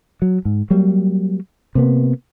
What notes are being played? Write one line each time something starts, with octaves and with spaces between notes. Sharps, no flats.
F#3
G#2
F#3 G3 A#3
C3 A#3 B3